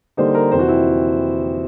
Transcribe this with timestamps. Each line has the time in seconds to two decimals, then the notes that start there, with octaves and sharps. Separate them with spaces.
0.17 D3 G3 A#3 D#4 C5
0.34 A#4
0.51 F2 C3 E3 C5
0.59 F#4
0.68 E4